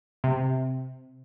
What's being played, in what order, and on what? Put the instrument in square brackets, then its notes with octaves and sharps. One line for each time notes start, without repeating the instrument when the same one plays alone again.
[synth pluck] C3